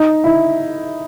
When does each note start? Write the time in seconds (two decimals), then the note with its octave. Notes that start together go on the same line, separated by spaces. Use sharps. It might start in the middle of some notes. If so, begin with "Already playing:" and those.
Already playing: D#4
0.24 E4